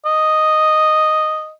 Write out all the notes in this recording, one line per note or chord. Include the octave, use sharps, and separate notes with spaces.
D#5